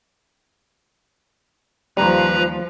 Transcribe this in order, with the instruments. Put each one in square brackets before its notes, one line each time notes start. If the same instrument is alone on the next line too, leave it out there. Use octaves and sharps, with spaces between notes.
[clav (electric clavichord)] D#2 G3 [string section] F3 [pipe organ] B4 A#5